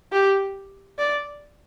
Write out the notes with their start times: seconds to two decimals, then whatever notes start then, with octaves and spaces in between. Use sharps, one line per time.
0.12 G4
0.98 D5